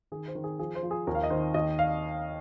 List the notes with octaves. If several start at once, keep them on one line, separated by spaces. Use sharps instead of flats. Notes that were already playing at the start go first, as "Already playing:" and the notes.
D#3 G#4
C5
D#3
G#4
F3 G#4
C5
F3
G#4
D#2 A#4
F5
D#5
D#3 C5
D#2 D#5
F5